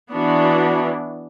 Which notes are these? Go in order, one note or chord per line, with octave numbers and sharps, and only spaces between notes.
E3 B3 D4 F#4